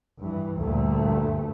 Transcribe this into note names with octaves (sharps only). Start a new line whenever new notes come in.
G2 E3
D2 G2 A#2 A3